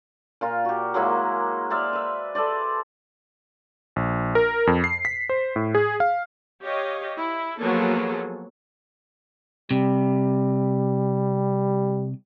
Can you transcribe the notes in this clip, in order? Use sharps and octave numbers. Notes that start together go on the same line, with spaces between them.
A#2 F4 A#4
F#4 G4
F#3 G#3 A#3 E4
C5 D5 E5 F5
B4 E5
A4 B4 C5 D5
A#1
A#4
F2
C7
B6
C5
A2
G#4
F5
G4 C#5 D#5 F5
E4
F3 F#3 A#3 B3 G#4 A4
C3 G3